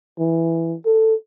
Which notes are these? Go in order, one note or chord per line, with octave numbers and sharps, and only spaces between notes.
E3
A4